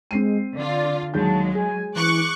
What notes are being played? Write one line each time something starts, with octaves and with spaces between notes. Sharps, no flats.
G#3 C4 C7 D#7
D3 F4 D5
D#2 F#3 G#3 G#4 A5 G6
G#4 G#5
E3 C#6 D6 F#6